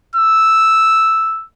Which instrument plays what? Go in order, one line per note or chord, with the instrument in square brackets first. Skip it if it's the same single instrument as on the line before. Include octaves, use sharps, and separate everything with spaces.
[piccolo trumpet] E6